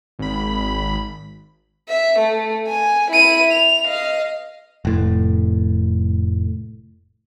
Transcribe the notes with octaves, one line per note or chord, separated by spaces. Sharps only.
G#1 B5
E5
A3
G#5
E4 D#7
F7
D#5 F5
F1 A2